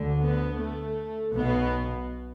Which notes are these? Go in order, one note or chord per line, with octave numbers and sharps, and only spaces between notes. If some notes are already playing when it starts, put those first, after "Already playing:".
Already playing: D2 D3
B3
A3
B1 B2 B3